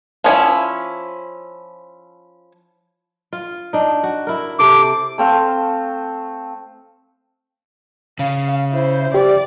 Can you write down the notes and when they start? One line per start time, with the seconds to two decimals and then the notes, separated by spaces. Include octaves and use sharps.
0.24 F3 C#4 E4
3.33 F4
3.73 D4 D#4
4.03 F#4
4.27 E4 A#4
4.59 C3 A4 C5 D6
5.18 A3 C4 F5
8.19 C#3 F5
8.71 E4 C5
9.14 G4 D5